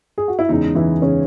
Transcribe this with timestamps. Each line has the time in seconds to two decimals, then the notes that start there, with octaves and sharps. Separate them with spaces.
0.18 G#4
0.28 F#4
0.39 E4
0.49 E2 C#3 G#3 D#4
0.75 E3 E4
1.02 C#3 G#3 C#4